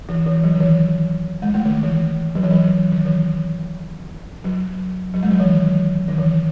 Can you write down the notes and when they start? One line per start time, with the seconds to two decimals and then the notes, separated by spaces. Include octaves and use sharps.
0.09 E3
0.26 E3
0.44 F#3
0.56 D#3
0.61 E3
1.42 G#3
1.54 A3
1.65 D#3
1.83 E3
2.35 F#3
2.43 E3
2.51 F#3
2.92 D#3
3.05 E3
4.44 F#3
5.14 F#3
5.23 G#3
5.31 F#3
5.40 E3
5.49 D#3
6.08 D#3
6.18 E3